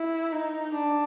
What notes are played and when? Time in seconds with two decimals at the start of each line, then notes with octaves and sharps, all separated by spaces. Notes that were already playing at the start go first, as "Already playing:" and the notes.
Already playing: E4
0.32 D#4
0.75 D4